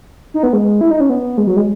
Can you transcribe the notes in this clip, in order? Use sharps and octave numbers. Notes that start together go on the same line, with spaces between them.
D#4
B3
G#3
E4
D#4
C#4
B3
G#3
F#3
G#3